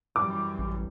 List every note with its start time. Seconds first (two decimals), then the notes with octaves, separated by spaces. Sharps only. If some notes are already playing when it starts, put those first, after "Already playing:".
0.16 F#2 E3 G3 D6
0.58 A1